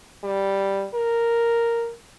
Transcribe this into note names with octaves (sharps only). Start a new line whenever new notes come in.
G3
A#4